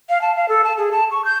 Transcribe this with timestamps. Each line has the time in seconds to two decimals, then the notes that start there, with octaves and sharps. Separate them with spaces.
0.09 F5
0.21 A5
0.36 F5
0.49 A4
0.64 A5
0.78 G#4
0.92 A5
1.11 C#6
1.25 G6